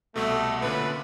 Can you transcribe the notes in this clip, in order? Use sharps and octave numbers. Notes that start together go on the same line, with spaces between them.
C2 B2 A3
A#2 D3 C#4 B4